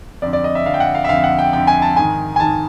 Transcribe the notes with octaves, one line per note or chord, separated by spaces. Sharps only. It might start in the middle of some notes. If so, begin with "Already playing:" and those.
F2 D3 D5
D5
D#5
E5
F2 D3 F5
G5
F#5
F5
E5
F2 D3 F5
F#5
G5
F2 D3 G5
G#5
A5
G#2 D#3 G#5
G#5
G#2 D#3 A5